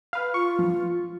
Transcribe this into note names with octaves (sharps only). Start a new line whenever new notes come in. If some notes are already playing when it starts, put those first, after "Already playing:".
B4 F5
F4 C#6
F3